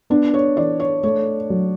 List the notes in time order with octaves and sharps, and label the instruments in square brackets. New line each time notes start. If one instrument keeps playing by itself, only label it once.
[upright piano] B3 [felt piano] D4
[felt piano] C#5
[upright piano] E3 [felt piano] D5
[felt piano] C#5
[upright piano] A3 [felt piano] C#5
[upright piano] F#3